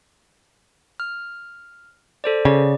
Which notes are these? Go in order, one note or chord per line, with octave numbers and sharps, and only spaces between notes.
F6
A4 C5 D5
C#3 D5